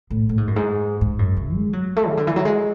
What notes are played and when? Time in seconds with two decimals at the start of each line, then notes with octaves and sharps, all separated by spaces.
0.10 A2
0.29 A2
0.38 G#2
0.47 F#2
0.56 G#2
1.01 G#2
1.19 F#2
1.37 C#3
1.55 G#3
1.73 F#3
1.96 A3
2.08 C#3
2.17 D3
2.27 E3
2.36 F#3
2.45 G#3